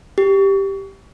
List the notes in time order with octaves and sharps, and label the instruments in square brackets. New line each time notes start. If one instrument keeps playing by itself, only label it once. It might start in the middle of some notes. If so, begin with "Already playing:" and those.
[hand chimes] G4